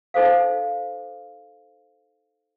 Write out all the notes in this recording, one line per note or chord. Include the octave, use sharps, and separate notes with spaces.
D#4 A4 C5 F5